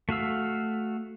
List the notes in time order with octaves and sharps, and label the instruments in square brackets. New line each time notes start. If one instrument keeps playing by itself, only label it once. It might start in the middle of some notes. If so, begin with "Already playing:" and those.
[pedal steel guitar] A3 F#4 F5 E6